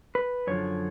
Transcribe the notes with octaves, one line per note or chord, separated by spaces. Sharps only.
B4
F#2 D3 F3 C#5